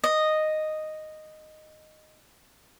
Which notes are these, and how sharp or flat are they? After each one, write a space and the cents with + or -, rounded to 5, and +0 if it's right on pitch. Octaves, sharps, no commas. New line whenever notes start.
D#5 -5